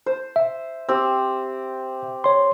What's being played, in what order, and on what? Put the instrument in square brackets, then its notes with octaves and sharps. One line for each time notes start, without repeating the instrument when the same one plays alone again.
[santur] C5
[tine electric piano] E5
[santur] C4 G4
[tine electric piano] C#5 C6